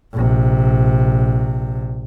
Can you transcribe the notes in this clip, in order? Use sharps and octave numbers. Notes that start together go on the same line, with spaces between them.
A#1 C3